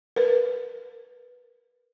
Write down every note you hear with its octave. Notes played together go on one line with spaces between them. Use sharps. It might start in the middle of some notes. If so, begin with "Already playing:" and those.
A#4 B4